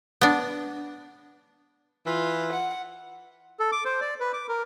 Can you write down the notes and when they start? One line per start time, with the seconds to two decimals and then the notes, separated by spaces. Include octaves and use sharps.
0.21 B3 D4
2.06 E3 F4
2.52 F#5
3.60 A4
3.72 D6
3.85 C5
4.01 D5
4.20 B4
4.33 D6
4.49 A#4